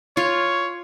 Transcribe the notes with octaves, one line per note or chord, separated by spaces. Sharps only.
F4 C#5